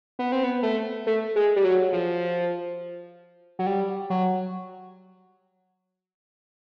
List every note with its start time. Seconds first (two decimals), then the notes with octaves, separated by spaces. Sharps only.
0.19 B3
0.32 C4
0.44 B3
0.63 A3
1.07 A3
1.36 G#3
1.56 G3
1.64 F#3
1.93 F3
3.59 F#3
3.66 G3
4.10 F#3